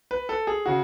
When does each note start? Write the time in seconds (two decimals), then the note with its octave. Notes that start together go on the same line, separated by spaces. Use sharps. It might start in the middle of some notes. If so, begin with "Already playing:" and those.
0.11 B4
0.29 A4
0.47 G#4
0.66 C#3 F#4